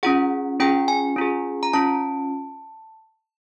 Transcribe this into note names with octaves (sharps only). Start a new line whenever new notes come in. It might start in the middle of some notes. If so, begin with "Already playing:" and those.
C#4 F4 G#4 F#5
C#4 F4 G#4 G5
G#5
C#4 F4 G#4
A#5
C#4 F4 A5